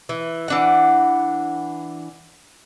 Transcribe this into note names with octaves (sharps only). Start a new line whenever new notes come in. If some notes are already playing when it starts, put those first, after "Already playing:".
E3
E3 D4 F#5